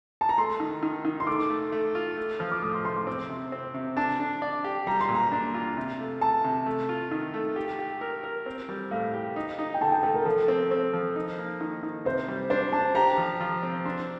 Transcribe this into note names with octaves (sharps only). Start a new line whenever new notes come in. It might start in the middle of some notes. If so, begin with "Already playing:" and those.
A5
A#5
A3 C6
D#3
D#3
D#3
C6
A3 D6
A3
A3
F4
A3
F3 F6
D6
A2 D#6
C6
A2 C6
D6
C4 C6
C3
C4
C3
D4 A5
D4
D5
G4
G3 A#5
C6
A#2
A#5
D4
F4
C3
A3
A3 A5
C3
A3
F4
D#3
A3
G4
G4
A#4
A#4
C4
G3
A2 F5
G4
D#4
D#4
G5
D3 A5
G5
A3 A4
A#4
F3 A4
C4
C4
F3
D#4
A#3
D#3
D#3
C3 C5
G3
D4 C5
D4 A5
G4 A#5
F3
F3
C4
D4 C6